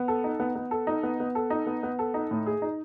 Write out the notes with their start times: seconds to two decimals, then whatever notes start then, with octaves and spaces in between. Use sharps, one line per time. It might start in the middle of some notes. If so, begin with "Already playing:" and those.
Already playing: B3
0.08 A4
0.24 D#4
0.40 B3
0.55 B3
0.71 A4
0.87 D#4
1.03 B3
1.20 B3
1.35 A4
1.50 D#4
1.66 B3
1.83 B3
1.99 A4
2.14 D#4
2.31 A2
2.46 G#4
2.62 D#4